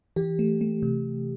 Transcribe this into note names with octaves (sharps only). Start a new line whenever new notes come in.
E3 G4
A3
A3
C3